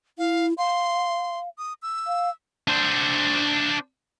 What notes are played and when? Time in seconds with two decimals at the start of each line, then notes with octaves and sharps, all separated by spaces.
0.18 E4 F5
0.58 F5 C6
1.58 D#6
1.82 E6
2.07 F5
2.68 D4 C5